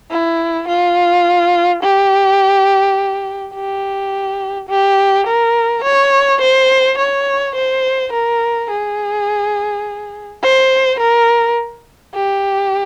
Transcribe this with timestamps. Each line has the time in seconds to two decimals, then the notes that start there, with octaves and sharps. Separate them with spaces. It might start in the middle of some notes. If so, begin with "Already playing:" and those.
0.11 E4
0.68 F4
1.83 G4
3.54 G4
4.69 G4
5.27 A#4
5.84 C#5
6.41 C5
6.98 C#5
7.55 C5
8.13 A#4
8.70 G#4
10.42 C5
11.00 A#4
12.14 G4